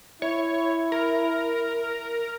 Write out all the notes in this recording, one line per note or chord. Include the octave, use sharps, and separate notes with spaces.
E4 C#5
A#4